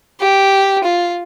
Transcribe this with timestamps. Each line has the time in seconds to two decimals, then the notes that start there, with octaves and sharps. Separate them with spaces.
0.20 G4
0.84 F4